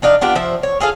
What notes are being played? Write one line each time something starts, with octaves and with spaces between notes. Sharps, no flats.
F3 D4 D#4 F5
B3 D4 F4 G4
F3 C5 E5
C#5
F4 G#4 A4 F5